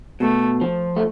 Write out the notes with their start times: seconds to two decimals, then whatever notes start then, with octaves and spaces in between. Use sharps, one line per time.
0.20 B2 A3
0.61 F3
0.96 A3